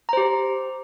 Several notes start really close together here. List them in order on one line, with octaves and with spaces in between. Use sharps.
A#5 C5 G4